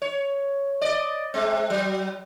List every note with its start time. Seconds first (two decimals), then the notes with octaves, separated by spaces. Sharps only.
0.02 C#5
0.81 D5 D#5
1.34 G#3 C4
1.70 F#3